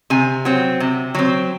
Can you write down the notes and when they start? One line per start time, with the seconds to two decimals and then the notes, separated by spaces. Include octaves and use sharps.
0.10 C3 G#5
0.45 F#3 C4
0.80 C3
1.15 F#3 C4